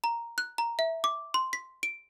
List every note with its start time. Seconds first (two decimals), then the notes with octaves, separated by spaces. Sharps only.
0.04 A#5
0.38 F#6
0.58 A#5
0.79 E5
1.04 D6
1.34 C6
1.53 B6
1.83 D7